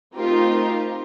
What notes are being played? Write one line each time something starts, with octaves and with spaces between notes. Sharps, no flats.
A3 C4 D#4 F4 G4 A#4